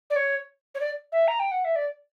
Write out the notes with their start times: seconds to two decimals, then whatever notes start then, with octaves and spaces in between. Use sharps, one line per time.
0.10 D5
0.16 C#5
0.75 C#5
0.80 D5
1.12 E5
1.28 A#5
1.40 G5
1.51 F#5
1.65 E5
1.76 D5